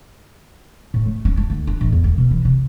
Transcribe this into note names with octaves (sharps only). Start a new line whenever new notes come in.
A2
A3
C#4
D4
D2
D4
A1
E2
D2
B2
E3
C3